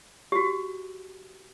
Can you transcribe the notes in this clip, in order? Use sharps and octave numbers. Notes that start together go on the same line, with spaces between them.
F#4 G4